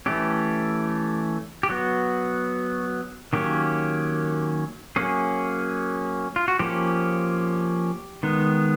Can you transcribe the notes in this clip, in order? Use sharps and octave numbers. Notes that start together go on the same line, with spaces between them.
E3 A3 C#4 G4
G4
F#3 B3 F#4
D#3 F#3 A#3 C#4 G4
F#3 A#3 C#4 G#4
F4
F#4
F3 A#3 C#4 G4
D#3 G#3 B3